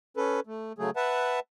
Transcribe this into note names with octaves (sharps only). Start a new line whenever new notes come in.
C#4 A4 B4
A3
C#3 F#3 A3 G#4
B4 E5 F#5 A5